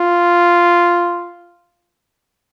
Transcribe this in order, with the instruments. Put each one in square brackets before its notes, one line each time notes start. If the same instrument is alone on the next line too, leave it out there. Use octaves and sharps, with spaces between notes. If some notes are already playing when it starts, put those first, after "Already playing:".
Already playing: [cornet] F4